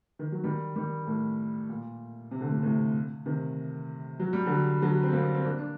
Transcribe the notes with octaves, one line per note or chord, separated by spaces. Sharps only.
D#3
F#3
D#3 G3
D#3 G3
A2
A#2
C3
D3
A2 C3
A2 C3
C3 D#3
F#3
G3
D3 F#3
D3 F#3
C4
G3 A#3
C4
A#3 D4
D4